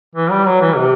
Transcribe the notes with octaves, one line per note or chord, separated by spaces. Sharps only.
E3
G3
F#3
E3
C3